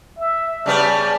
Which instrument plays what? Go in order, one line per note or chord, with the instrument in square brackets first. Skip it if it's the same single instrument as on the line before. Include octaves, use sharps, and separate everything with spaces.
[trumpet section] E5
[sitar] C#3 G3 B3 [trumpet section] D5 A5